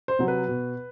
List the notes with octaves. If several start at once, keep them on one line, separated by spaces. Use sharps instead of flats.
C5
C3 F#3
B4
B2